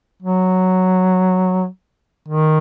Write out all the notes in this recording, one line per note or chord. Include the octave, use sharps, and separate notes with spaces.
F#3
D#3